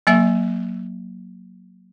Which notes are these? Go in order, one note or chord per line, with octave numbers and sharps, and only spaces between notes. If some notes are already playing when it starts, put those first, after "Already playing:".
F#3 A#3 E5